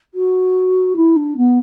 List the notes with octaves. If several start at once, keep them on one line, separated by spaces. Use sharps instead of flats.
F#4
E4
D4
B3